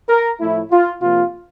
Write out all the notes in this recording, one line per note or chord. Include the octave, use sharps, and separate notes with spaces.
A#4
A2 F3 A3 E4
F4
C3 F3 A#3 F4